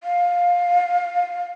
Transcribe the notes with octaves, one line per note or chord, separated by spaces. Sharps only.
F5